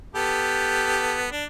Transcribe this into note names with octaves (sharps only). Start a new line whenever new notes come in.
B3 G4 A4
D4